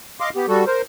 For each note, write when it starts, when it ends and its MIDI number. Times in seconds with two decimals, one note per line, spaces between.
0.20 0.30 75
0.20 0.30 77
0.20 0.30 84
0.20 0.30 86
0.36 0.46 59
0.36 0.46 67
0.48 0.65 55
0.48 0.65 66
0.48 0.65 69
0.67 0.82 70
0.67 0.82 72